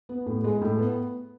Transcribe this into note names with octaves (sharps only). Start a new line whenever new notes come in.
B3
A2
G#3
A2
B3